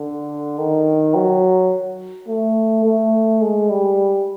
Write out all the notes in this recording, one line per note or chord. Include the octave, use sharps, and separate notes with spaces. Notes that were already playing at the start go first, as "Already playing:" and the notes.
Already playing: D3
D#3
F#3
A3
A3
G#3
G3